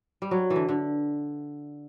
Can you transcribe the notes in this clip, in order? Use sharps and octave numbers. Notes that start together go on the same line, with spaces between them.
G3
F#3
E3
D3
D3